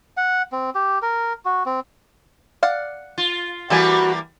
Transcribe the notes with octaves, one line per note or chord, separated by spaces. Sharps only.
F#5
C4
G4
A#4
F#4
C4
D5 F5 F#5
F4
E3 G3 A#3 F#4 A4 G#5